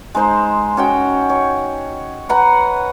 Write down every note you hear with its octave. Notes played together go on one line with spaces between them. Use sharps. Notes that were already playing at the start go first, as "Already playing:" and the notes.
G#3 D#4 C5
C#4 F#4 G5
C#5
B4 F#5 A#5